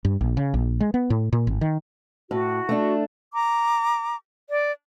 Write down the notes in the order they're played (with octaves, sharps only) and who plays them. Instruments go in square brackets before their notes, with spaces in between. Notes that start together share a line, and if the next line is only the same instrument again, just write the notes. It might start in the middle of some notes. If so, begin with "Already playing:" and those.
[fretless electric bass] G2
A#1
C#3
A#1
G#3
B3
A2
A#2
G#1
D#3
[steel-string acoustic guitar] A2 [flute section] F#4
[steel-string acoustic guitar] A3 D4
[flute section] A#5 D6
D5